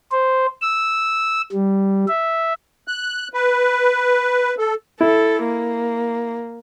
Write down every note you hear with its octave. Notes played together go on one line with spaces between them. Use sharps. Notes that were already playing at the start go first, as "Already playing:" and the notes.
C5
E6
G3
E5
F#6
B4
A4
E4 A4
A#3